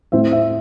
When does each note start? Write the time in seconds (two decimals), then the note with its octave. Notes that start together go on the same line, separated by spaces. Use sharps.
0.12 A2 A3 C4 E4 E5
0.32 E5